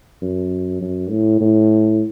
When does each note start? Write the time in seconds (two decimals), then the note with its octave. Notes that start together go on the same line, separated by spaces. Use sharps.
0.22 F#2
0.81 F#2
1.10 A2
1.41 A2